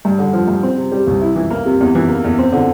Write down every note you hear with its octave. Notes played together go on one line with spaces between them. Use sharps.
G2
D3
F3
G2
C4
C3
G3
C2
E4
E3
A#3
C3
E2
E3
A#3
E2
C4
D3